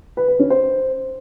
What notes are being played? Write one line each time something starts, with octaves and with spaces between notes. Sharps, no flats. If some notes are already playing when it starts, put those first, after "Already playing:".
B4
B4
C#4
C5